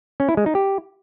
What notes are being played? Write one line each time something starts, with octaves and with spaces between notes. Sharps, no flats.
C#4
E4
G#3
D#4
G4